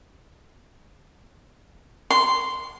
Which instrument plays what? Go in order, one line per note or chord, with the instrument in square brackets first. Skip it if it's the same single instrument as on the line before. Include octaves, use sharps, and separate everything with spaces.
[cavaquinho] C6